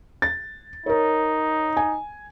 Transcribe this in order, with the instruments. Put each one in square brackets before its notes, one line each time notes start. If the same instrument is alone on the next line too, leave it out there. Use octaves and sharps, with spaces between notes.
[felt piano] A6
[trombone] D#4 [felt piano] A#4 C#5
[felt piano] G#5